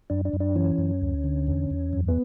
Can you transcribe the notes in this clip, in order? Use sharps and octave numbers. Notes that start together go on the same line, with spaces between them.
F#2 D4
D4
F#2
D4
E3 C#4
F#2
D2
D3
E2
E2
F#2
B3